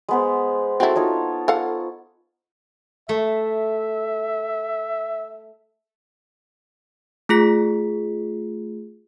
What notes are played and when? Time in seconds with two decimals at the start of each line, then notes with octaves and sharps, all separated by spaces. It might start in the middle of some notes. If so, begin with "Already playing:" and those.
0.08 G#3 B3 C5
0.80 C4 E4 F#4 A4
0.96 D#4 F4 C#5
1.48 A4 F5 F#5
3.09 A3 E5
7.29 A3 F4 G#4 B6